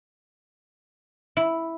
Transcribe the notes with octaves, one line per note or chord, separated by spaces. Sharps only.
E4